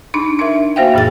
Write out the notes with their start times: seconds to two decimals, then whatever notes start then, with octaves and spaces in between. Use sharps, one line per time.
0.14 D4 D#4 B5
0.39 D4 D#4 A#4 E5
0.76 A#3 F#4 C5 E5 F5 G5
0.94 F#2 A#2 E3 G#4 A6